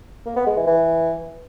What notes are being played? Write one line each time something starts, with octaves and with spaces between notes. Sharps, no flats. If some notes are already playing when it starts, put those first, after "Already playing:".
A#3
B3
G#3
E3
E3